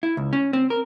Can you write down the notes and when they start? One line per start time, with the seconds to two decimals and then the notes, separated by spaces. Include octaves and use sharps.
0.03 E4
0.17 C#2
0.33 C#4
0.53 C4
0.70 A#4